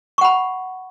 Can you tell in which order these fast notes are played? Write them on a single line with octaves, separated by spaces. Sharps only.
C#6 F#5 B5